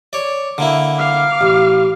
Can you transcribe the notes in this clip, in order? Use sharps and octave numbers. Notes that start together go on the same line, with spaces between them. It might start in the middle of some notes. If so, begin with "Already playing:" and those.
C#5 D5
D3 A#3 E4
F5 D6
A1